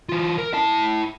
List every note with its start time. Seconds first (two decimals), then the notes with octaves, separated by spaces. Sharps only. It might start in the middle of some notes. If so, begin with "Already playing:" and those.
0.09 E3 F4
0.38 A#4
0.54 E4 A5